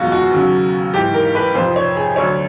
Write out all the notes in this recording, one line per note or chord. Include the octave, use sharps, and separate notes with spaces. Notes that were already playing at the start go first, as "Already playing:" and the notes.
Already playing: F#1 E2 B2 G#3 F4 F#4
F#4
D#2 C#3 F#3
G#1 G#2 E3 G4
A#4
B4
F2 C3 F3 C5
C#5
G#4
D2 D3 F#3 A3 C#5